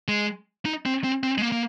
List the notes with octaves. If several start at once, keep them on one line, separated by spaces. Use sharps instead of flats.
G#3
D#4
C4
C4
C4
G#3
A#3
A#3